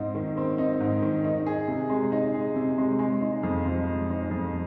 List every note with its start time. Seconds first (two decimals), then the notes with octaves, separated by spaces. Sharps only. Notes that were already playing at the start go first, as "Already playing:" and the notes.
Already playing: G#2 C4 D#4
0.15 D#3
0.37 C4
0.58 D#4
0.80 G#2
1.02 D#3
1.24 D#4
1.47 G#4
1.68 C3
1.90 G#3
2.12 D#4
2.34 G#4
2.56 C3
2.78 G#3
2.99 G#3
3.21 D#4
3.43 F2
3.65 F3
3.87 G#3
4.09 D#4
4.31 F2